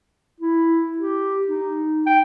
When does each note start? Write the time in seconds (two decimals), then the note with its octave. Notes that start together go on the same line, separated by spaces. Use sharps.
0.40 E4
0.98 G4
1.47 D#4
2.06 G5